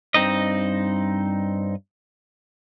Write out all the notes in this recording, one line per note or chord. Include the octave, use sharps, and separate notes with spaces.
G2 C4 D#4 D#5